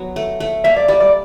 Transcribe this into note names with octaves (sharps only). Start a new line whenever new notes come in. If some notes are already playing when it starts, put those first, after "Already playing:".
Already playing: F#3 B3
A3
A3
A#3 E5
D5
G3 D5
D5